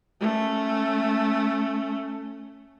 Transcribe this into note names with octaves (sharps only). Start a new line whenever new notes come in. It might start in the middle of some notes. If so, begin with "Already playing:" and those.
A3 C#4